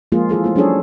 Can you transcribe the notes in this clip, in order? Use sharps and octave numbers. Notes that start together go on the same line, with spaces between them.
F3 G#3 A#3 F4 G#4
E3 F4 G#4 A4
A3 C4 F4
F#3 C#4 D4 G#4 A4 C#5